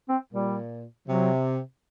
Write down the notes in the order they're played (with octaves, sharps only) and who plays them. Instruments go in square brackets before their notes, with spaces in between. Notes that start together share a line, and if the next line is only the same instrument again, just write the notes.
[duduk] C4
[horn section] A#2 [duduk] G3
[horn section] C3 [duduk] F#3